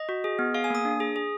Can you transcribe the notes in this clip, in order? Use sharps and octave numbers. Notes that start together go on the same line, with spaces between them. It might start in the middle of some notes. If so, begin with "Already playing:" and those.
Already playing: D#5
F#4
G#4
B3
G#4 F5
G#5
A#3 D#6
D4
G#4
G#4